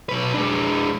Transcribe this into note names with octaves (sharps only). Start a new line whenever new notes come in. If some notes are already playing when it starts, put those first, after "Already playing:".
B1 B4
G#3 D4